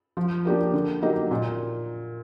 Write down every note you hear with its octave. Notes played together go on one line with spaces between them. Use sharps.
F3
A#3 D4 G4 A#4
D3
F#3 A#3 D#4 G4
A#2